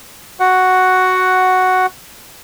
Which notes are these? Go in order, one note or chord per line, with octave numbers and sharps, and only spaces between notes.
F#4 F#5